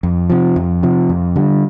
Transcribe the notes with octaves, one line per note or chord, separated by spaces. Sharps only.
F2
C3 F3
F2
C3 F3
F2
D3 G3